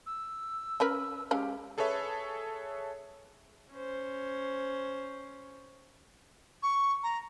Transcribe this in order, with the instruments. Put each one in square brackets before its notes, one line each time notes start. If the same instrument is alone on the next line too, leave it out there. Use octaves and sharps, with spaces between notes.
[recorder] E6
[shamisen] C#4 A#4 B4
[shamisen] G#3 C#4 F5 [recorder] G4
[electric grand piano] G#4 A4 B4 C#5 E5
[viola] C#4 C5
[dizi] C#6
A#5